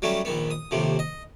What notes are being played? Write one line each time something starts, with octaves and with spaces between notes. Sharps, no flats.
F#3 G3 A3 C#4
A#1 D#3 B3
D#6
D#2 A2 C3 F3
D#5